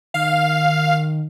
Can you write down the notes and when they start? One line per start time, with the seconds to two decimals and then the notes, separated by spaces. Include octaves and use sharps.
0.14 D#3 F5